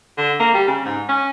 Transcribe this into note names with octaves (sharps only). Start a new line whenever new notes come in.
D3
A#3
G3
C#3
G#2
C#4